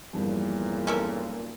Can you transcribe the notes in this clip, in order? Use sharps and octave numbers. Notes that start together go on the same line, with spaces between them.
B1 E2 G2 A#2 F3
C#4 A4 A#4